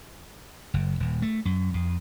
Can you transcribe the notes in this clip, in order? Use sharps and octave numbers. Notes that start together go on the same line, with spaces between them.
F#1
D#1
A3
F#2
F2